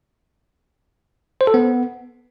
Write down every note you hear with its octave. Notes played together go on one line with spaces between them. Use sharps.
C5
A4
B3